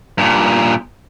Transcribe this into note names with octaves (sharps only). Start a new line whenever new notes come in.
G2 A#2